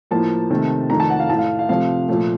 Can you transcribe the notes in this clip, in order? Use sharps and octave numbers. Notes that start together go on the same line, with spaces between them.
A2 F3 A#3 A5
C3 D#3 A3
F2 D#3 A3 A#5
A5
F#5
F5
A2 A3 F5 A5
F5
C3 F3 A3 F5
A#2 F3 A3